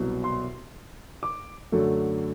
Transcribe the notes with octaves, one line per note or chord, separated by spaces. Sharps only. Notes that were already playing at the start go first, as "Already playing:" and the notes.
Already playing: C2 B2 F#3
C6
D6
F#2 D3 F#3 A3